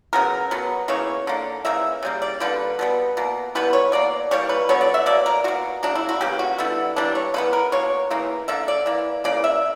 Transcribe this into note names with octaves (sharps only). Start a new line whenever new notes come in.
C#3 F#3 B3 A#4
B2 F#3 B3
C#3 E3 A#3 C#5
D3 A#3
C#3 E3 A#3 E5
C#3 G3 A#3
D5
D3 G3 A#3 B4
B2 G3 B3
B2 A#3
E3 G3 B3 B4
C#5
B2 A#3 D5
E3 G3 A#3 C#5
B4
D3 F#3 B3 C#5
D5
E5
B2 A#3 D5
A#4
B2 A#3 F#4
C#3 F#3 A#3 D4
E4
F#4
C#3 E3 A#3 G4
F#4
D3 G3 B3 E4
E3 G3 A#3 D4
C#5
C#3 E3 B3 B4
A#4
B2 A#3 C#5
C#3 E3 A#3
D3 A#3 E5
D5
E3 A#3
C#3 E3 A#3 D5
E5